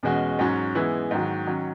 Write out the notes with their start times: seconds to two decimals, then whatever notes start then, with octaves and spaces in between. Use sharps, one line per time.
0.03 E2 B2 G#3 C#4 F#4
0.39 G#2 F#3 C#4
0.75 E3 G#3 B3 E4
1.11 G#2 D#3 F#3
1.47 D#3 F#3 C#4